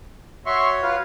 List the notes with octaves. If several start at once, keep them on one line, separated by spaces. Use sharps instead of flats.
F#4 C#5 E5 C6 C#6
F4 B4 F5